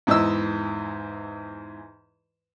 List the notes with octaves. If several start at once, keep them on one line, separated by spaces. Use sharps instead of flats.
E2 G#2 E3 D#5 E6